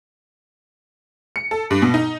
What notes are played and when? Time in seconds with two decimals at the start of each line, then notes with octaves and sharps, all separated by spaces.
1.36 C#7
1.51 A4
1.71 G2
1.82 B2
1.94 D#4